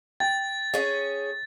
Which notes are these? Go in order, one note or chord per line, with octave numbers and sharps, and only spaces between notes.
G5 A6
C#4 G#4